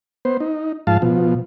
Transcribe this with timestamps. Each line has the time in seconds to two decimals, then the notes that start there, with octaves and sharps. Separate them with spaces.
0.25 B3 C5
0.40 D#4
0.87 G#2 F3 F5 A5
1.02 B2 F3